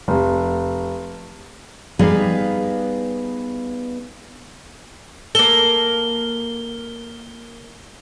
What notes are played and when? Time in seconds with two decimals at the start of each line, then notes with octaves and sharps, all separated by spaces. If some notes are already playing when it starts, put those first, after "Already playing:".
0.08 F1
1.99 G3 B3 D#4 G#4 B4 F5
5.35 A#3 A4 G7